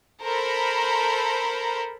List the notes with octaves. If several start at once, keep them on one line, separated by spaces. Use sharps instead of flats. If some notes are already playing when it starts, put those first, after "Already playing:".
A4 A#4 C5 A#5 B5